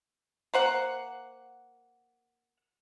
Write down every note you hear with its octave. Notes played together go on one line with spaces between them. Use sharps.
A#3 C5 F#5